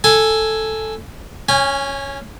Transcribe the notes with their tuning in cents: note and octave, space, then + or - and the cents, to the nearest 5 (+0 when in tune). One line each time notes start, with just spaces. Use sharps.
A4 +0 G#5 +0
C#4 +0 G#5 -30